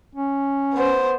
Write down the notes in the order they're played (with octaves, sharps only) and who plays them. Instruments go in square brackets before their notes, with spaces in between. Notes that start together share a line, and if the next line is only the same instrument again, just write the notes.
[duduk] C#4
[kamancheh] B3 C5